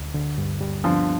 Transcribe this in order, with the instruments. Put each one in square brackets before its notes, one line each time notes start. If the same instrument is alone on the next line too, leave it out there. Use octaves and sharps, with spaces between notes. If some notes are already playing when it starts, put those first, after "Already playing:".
Already playing: [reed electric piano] D2
D3
G2
G3
[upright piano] D3 F3 [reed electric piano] B3